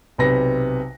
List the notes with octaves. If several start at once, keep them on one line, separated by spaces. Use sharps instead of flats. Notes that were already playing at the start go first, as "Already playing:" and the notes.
B1 C3 B4 A#6